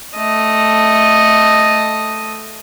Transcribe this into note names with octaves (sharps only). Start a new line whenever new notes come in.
A3 D#5